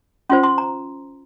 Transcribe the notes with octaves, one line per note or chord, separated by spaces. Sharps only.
C#4 F4 C5 C6
C6
A#5